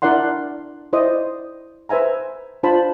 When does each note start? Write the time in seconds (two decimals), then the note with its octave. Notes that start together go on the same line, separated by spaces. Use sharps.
0.02 D4 E4 A#4 D5 F#5 C6
0.93 E4 C5 D5 D#5 D#6
1.89 B4 C5 E5 G#5 A#5
2.63 D4 F4 C5 A5 B5